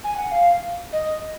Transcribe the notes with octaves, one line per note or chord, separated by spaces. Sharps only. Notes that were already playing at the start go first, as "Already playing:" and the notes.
G#5
F#5
F5
D#5